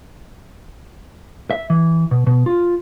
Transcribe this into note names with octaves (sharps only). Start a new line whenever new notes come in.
E5
E3
B2
B2
F4